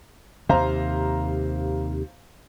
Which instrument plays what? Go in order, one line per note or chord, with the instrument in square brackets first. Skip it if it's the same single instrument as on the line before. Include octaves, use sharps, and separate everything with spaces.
[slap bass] D#2 C3 [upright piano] C5 F5 A#5